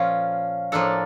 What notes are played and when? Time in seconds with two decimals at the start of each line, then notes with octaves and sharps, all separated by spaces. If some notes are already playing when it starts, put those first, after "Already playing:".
Already playing: A#2 F3 C#4 F5
0.72 A2 F3 A#3 D4 A4